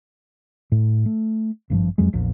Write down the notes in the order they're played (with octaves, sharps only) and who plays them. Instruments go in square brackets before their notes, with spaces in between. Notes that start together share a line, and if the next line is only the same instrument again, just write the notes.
[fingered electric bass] A2
A3
G#1 G2 D3 F3
F2 F#3 G#3
A#1 E2 A#2